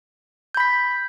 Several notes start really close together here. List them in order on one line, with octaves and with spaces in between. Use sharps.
G6 B5 B6